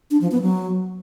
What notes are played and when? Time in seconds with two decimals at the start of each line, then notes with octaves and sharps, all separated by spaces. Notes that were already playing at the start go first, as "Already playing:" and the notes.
0.11 D4
0.21 F3
0.32 B3
0.42 F#3